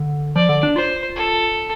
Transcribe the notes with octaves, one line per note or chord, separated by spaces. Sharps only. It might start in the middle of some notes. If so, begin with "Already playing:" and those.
Already playing: D3
F3 D5
D3
D4
F4 C5
A4